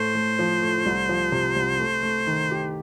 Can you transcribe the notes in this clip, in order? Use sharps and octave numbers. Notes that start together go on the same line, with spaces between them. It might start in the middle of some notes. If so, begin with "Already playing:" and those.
Already playing: A2 A3 C5
A3
F3
A3
C2
F3
C3
C2
A3
A3
D#3
G4